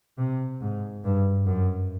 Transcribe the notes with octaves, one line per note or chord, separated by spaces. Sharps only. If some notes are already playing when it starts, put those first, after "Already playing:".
C3
G#2
G2
F#2